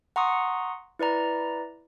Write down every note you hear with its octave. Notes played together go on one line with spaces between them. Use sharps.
F#5 A#5 C6 C#6 D#6
E4 B4 D5 A#5